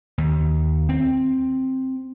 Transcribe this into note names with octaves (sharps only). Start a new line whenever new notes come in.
D#2
C4